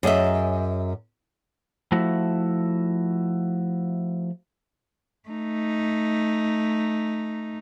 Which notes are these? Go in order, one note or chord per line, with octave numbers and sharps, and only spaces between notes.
F#2 G#4 D#5 E5
F3 A3 E4 F#4
A3 D#4